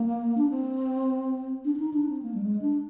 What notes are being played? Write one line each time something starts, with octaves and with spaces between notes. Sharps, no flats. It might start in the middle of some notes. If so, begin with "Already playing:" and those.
Already playing: A#3
D4
C4
D4
D4
D#4
D4
C4
A#3
G3
G#3
D4